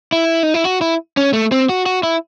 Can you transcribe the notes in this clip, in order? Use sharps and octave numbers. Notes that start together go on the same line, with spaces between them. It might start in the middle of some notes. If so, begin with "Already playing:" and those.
E4
D#4
E4
F#4
E4
C#4
A3
C4
F#4
F#4
E4